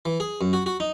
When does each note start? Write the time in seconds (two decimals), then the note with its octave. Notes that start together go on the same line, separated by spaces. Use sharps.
0.05 E3
0.20 G#4
0.41 F#2
0.53 F#4
0.66 F#4
0.80 D#4